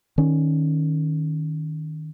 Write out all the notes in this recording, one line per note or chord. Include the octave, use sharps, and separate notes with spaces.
D#3 C#4